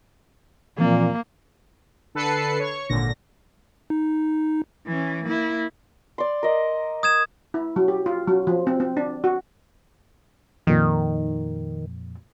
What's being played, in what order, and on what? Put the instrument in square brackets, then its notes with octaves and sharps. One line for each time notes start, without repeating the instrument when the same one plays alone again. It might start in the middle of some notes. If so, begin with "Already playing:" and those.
[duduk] A#2 [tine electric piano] E3 F3 C4 [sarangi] A#3
[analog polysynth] D3 A4 B4 A5 C7 C#7
C#5 C#6
G#1 A#2 D3 A#6
[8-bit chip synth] D#4
[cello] E3 C#4
A#3 E4
[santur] D5 C6
A#4 D#5
[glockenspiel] D#6 G#6 E7
[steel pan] E4
F#3
G4
F4
F#3
F3
C4
C4
D4
F#4
[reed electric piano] F2 A#2 [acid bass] D#3